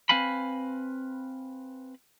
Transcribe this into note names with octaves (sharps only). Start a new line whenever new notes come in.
C4 B4 F5 G#5 B5